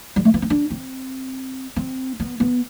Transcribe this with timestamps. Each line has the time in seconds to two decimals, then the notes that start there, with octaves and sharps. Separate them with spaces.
0.16 G3
0.25 A3
0.34 B3
0.42 C4
0.50 D4
0.71 C4
1.76 C4
2.20 B3
2.40 B3